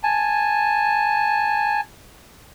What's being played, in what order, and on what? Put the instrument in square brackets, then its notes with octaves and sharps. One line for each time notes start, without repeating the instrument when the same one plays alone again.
[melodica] G#5 A5